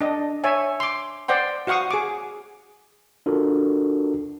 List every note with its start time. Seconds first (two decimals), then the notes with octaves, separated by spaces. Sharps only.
0.01 D4 D#5
0.44 C#5 E5 G#5
0.80 C6 D6
1.28 C5 D5 F#5 G5 C6
1.67 F#4 F5 F#5 C#6 D#6
1.91 G#4 D6
3.26 D4 F4 F#4 A4 A#4